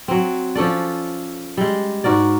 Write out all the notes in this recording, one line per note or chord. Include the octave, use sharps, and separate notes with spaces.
F#3 C4
F3 C#4 A4 D5
G3 G#3
G#2 F#4 A#4 D5